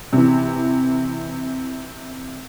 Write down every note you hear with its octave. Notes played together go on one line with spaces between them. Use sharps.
C3 E3